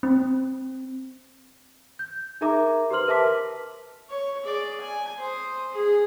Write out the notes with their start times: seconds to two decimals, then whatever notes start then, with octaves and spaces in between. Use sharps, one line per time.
0.03 C4
1.99 G6
2.41 D#4 G#4 A#4 E5 A#5 D6
2.90 G4 B4 C5 C6 F6 F#7
3.07 A#4 B4 E5 A5 D6 B6
4.09 C#5
4.43 G#4 D5
4.81 G#5
5.19 C5 D#6
5.73 G#4